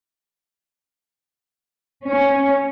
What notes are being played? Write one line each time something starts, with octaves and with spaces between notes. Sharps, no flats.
C#4